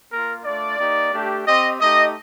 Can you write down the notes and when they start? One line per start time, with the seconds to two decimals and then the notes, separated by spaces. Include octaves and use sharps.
0.11 A#3 F4 A#4
0.45 A3 D4 F4 D5
0.78 A#3 D#4 G4
1.12 A3 D4 G4
1.46 C4 G4 D#5
1.80 A3 D#4 G4 D#5